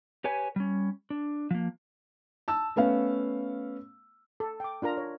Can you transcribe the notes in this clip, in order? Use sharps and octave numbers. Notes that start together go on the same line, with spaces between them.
G4 B4 C#5 G#5
G3 C#4
D4
F3 A#3
A5 E6
A3 B3 C#4 F5
A4
G5 D6
D4 F4 A#4 A#5
C#5